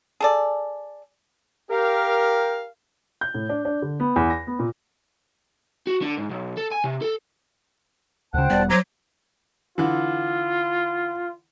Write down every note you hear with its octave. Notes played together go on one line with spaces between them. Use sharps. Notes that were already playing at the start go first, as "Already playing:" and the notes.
G#4 A4 D5
G4 A#4 F5
G6
A2
D4
D4
D3
B3
E2
A#6
B3
A#2
F#4
D3
G#2
B1
A4
G#5
C3
A4
D2 C#3 C5 F#5 G5 A5
E1 G3 B3 D5
F#3 C5 A#5 D6 G#6
D3 E3 F4